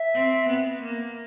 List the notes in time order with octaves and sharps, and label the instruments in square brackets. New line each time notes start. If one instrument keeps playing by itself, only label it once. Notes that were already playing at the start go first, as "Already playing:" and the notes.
Already playing: [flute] E5
[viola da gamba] C4
B3
A#3